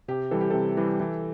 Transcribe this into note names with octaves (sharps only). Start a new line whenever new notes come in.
C3 G4
E3 G3 A4
G4
C3 A4
E3 G3
E3